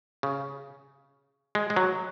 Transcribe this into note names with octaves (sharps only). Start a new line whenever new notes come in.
C#3
G#3
G#3
F#3